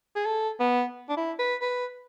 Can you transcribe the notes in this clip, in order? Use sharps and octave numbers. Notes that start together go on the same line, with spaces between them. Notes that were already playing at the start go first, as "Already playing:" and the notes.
G#4
A4
B3
D4
E4
B4
B4